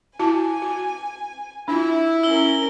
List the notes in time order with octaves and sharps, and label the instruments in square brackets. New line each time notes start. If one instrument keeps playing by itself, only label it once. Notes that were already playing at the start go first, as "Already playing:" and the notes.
[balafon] E4 F#4 A5 [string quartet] G#5
[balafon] F#4
[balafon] D4 F4 [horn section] E4
[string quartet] C#4 A#4 [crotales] E6 G7